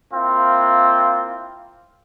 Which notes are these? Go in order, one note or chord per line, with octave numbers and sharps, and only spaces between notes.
A#3 C4 E4 F4